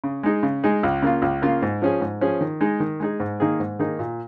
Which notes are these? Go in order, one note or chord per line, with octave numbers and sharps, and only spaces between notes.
C#3
G#3 D#4 G#4
C#3
G#3 D#4 G#4
C#2
C#3 A#3 F4
C#2
C#3 A#3 F4
G#2
F3 C#4 G#4
G#2
F3 C#4 G#4
D#3
G#3 D#4 G#4
D#3
G#3 D#4 G#4
G#2
D#3 A#3 D#4 G#4
G#2
D#3 A#3 D#4 G#4
A#2